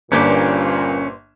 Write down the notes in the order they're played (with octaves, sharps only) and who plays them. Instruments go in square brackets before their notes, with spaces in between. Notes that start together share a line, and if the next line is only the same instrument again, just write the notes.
[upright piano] G1 A#3 [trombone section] G2 A#2 [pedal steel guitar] C#4 [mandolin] B4 C5 D5